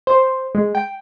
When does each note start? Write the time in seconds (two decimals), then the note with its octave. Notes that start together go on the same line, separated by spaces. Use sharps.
0.07 C5
0.55 G#3
0.75 G5